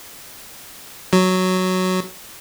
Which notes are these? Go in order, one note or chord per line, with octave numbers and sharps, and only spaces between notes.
F#3